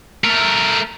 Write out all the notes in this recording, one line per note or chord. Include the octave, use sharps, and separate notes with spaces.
A3 A#4